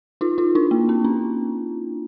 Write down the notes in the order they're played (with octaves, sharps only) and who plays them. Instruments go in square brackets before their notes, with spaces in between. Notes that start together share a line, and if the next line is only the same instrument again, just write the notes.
[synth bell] D#4 F4
D#4 F4
D4 E4
A#3
C4
C#4